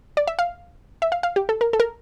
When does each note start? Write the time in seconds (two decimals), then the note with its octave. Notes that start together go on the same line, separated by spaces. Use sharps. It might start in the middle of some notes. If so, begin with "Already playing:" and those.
0.17 D5
0.27 E5
0.39 F5
1.02 E5
1.12 F5
1.23 F5
1.36 G4
1.49 A4
1.61 A#4
1.73 A4
1.80 A#4